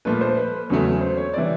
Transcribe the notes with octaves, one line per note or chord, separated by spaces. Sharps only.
A#2 F3 A3 B4
C5
B4
E2 C#3 F#3 A3
C5
C#5
C3 E3 D5